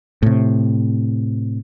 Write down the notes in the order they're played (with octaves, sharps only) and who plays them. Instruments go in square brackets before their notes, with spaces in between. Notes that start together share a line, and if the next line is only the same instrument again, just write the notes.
[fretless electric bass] A2 C3